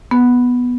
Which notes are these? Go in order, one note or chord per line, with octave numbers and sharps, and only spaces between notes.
B3